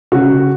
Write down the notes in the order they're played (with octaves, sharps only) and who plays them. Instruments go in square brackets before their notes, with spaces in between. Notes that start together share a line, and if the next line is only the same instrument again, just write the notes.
[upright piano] C#3 F#4